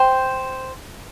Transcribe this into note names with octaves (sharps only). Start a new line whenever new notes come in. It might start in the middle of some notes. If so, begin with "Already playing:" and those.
Already playing: C5 G5